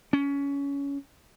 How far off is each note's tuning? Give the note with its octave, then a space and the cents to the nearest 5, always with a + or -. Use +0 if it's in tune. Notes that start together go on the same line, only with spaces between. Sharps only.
C#4 +20